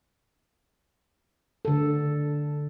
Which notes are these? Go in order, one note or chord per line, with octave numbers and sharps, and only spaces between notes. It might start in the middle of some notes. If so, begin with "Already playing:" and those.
D3 A4